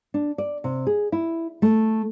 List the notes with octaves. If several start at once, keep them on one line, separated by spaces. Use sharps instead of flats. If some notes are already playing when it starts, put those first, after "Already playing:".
D4
D5
C3
G#4
E4
A3